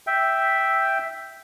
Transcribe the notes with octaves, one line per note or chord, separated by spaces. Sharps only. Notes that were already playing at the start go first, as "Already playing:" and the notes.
E5 G5